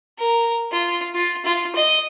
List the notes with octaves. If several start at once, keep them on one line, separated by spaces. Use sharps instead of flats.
A#4
F4
F4
F4
D#5